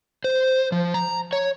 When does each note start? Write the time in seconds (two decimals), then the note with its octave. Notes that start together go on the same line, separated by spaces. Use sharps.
0.24 C5
0.72 F3
0.94 A#5
1.33 C#5